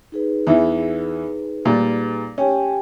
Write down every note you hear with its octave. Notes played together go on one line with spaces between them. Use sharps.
D#4 G#4 B4
E2 E3
A#2 G3
C#4 G4 G5 G#5